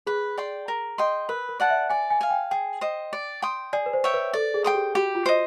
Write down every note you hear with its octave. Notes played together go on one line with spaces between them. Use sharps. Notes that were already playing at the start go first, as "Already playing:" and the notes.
G#4 B4
D5 G5 C6
A#4
D#5 G5 C6
A#4 B4
A#4
D5 F#5 A5
E5
D5 G#5
G#5
F5 G#5
G5
G#4 G5
C5 D#5
D5
G5 C6 D#6
G#4 D5
B4
C5
C#5 E5 G5
B4
A4 D5
G#4
G#4 G5 C6 D#6
G4
F#4 G4
F4
C5 D#5